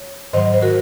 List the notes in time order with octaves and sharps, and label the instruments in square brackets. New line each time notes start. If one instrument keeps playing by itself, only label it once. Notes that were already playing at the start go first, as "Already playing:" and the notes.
Already playing: [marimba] C#5
G#2 D#3 F#3 C5 D#5
C5
F#4 A#4